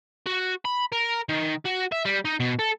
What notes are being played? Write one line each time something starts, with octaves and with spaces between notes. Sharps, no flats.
F#4
B5
A#4
D#3
F#4
E5
G3
D#4
B2
A4